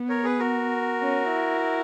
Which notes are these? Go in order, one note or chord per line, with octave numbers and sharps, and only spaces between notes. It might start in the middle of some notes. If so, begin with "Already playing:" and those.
Already playing: B3
A#4 C#5
G#4 B4
F#4 A#4
C#4
E4